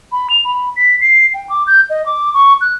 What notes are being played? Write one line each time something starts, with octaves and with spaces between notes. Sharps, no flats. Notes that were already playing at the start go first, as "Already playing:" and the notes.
B5
F7
B5
B6
C7
G5
D6
G6
D#5
D6
C#6
F#6